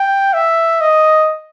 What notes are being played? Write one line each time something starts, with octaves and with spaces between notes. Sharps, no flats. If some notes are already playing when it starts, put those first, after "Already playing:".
Already playing: G5
E5
D#5